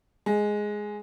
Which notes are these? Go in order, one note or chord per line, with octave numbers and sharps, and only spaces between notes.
G#3